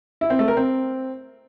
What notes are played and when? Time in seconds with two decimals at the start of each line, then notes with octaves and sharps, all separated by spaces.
0.21 E4
0.30 C4
0.39 A3
0.48 A#4
0.57 C4